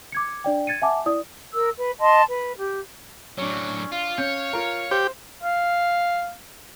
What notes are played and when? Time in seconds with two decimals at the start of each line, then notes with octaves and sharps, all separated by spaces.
0.12 D6 G#6 C#7
0.44 D4 D5 G5
0.67 G#6 A6 C#7 D#7
0.82 E5 F#5 G#5 A5 D6
1.06 E4 D5 D#6
1.54 A#4 E6
1.75 B4
2.00 D#5 A5 C6
2.28 B4
2.57 G4
3.38 A2 F#3 C#4 D4 C#5
3.92 F4 F5
4.18 C#4 C#5 G6
4.53 F4 A#4
4.91 G4 C5
5.43 F5